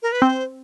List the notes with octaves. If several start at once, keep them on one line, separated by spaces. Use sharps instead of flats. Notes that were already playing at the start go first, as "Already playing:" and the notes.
A#4
B4
C4 C5